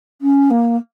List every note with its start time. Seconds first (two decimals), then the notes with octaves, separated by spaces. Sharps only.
0.21 C#4
0.50 A#3